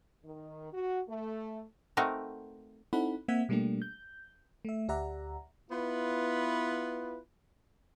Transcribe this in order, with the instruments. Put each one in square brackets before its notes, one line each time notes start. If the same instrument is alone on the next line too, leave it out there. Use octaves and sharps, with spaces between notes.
[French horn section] D#3
F#4
A3
[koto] A3 C4 D#4 F#4 A#4
[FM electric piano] C4 D#4 E4 A4 F#5 B5
A#3 C4 E5 F#5 G#6 B6
B2 G3 A3 A#3 D4 G4
G6
A3 E5
D2 G4 D5 E5 F#5 A#5
[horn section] B3 E4 F4 B4